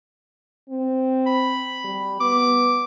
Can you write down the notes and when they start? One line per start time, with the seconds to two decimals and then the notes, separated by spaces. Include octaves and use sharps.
0.69 C4
1.26 B5
1.84 G3
2.20 B3 D6